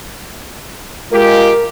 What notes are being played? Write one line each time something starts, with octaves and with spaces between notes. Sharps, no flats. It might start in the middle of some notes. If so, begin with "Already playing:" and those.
G#3 F4 G4 A#4